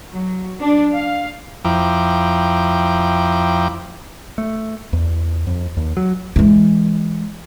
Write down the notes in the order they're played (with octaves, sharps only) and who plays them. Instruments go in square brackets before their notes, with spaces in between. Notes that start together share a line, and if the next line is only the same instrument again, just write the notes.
[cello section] F#3
D4
F5
[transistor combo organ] F2 F3 E4 G5 A#5 D6
[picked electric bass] A3
E2
F2
D#2
F#3
[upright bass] E3 G#3